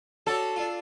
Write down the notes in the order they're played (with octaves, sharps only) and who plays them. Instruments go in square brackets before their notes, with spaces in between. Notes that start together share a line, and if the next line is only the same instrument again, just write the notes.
[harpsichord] D4 F#4 C#5 [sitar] A4
[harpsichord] D4 F4